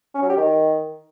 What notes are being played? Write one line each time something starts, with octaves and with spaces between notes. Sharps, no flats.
C#4
F#3
G4
D#3